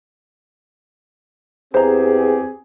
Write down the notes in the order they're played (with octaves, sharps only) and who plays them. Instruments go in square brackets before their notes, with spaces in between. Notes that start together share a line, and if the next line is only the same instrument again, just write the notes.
[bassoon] E2 [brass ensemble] C4 G4 G#4 [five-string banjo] C5 A#5